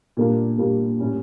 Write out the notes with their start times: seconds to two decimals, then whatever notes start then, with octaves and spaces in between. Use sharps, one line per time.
0.17 A#2 G3 A#3 D4 F4
0.58 A#2 G3 A#3 D4 F4
0.99 A2 G3 C#4 E4